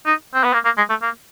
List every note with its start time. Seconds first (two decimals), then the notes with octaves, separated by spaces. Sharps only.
0.06 D#4
0.34 C4
0.43 B3
0.53 A#3
0.65 A#3
0.77 G#3
0.89 A3
1.02 A#3